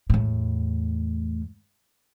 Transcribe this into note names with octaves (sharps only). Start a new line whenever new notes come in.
E2 A2